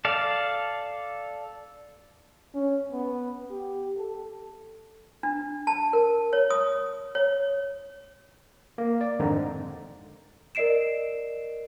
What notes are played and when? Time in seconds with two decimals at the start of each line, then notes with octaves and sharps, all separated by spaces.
0.05 A4 D5 F5
2.55 C#4
2.91 B3
3.51 G4
3.97 A4
5.23 D4
5.67 A5
5.93 A#4
6.33 C#5
6.50 D#6
7.15 C#5
8.78 A#3
9.01 D5
9.20 F2 G#2 D3 D#3 C4 D#4
10.55 A#4 D5 D#5 C7 D7 E7